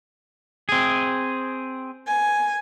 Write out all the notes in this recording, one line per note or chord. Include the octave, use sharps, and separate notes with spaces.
C4 G#4
G#5